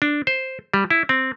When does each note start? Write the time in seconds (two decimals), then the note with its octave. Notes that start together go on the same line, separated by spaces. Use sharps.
0.02 D4
0.27 C5
0.74 G3
0.91 E4
1.09 C4